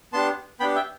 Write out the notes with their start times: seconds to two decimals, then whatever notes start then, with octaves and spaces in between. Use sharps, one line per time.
0.13 B3 D4 G4 A5 C6
0.60 B3 D4 G4 G5 B5
0.76 E5 G5